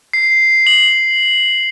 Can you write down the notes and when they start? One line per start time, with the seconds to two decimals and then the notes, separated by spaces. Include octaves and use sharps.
0.13 C7
0.67 F#7